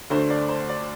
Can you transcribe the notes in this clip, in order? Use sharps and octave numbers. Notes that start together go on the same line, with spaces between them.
D2 D3 A3 D4 C5
D5
C5
D5